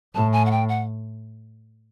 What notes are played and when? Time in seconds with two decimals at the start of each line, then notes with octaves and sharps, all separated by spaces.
0.15 A2 A5
0.33 G#5
0.46 F#5
0.51 G5
0.69 F#5